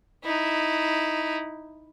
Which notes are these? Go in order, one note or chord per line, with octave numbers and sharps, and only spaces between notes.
D#4 E4